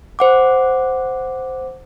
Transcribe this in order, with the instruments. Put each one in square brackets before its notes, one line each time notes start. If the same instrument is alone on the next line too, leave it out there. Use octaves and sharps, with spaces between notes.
[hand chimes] C5 F#5 D6